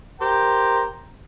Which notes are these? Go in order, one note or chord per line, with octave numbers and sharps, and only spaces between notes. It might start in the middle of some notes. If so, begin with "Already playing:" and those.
G4 A#4 C5 G5 A#5